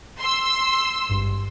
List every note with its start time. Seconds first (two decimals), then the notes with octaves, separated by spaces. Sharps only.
0.19 C6 E6
1.09 G#1 G2